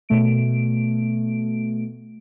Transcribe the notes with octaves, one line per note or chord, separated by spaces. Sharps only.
B2 A3 D7